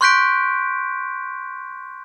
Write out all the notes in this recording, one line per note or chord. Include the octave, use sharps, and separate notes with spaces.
C6 C#6 F#6 G6 B6 D7